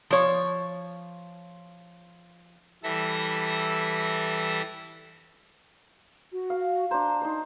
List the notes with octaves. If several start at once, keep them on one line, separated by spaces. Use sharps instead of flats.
F3 C#5
E3 G3 A4 E5 A#6
F#4
F5
D4 C5 A#5
D#4 C5